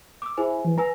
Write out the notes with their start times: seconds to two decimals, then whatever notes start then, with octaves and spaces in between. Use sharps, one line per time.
0.22 D6 E6
0.37 E4 G#4 C5 G#5
0.65 E3
0.78 B4 G#5 A#5 E6